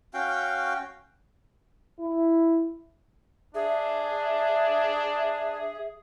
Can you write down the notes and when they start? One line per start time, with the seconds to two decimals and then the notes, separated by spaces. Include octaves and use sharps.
0.14 C#4 F#4 F5 G5
1.99 E4
3.55 D4 G#4 E5